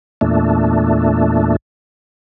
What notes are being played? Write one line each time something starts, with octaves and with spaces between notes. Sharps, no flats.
E2 A#2 A3 D4